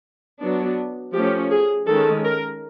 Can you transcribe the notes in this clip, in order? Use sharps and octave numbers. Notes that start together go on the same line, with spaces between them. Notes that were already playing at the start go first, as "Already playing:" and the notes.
F#3 B3 D4
F3 A3 C#4 G4
G#4
D#3 G#3 C#4 A4
A#4